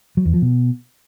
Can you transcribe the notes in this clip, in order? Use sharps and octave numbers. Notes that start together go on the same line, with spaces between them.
F#3
E2
F3
B2